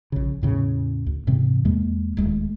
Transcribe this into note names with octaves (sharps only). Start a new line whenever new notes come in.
A#1 C#3
E2 A2 C#3
D2
G#2 C3 E3 C4
E2 G#3 A#3
D#1 G#3 A3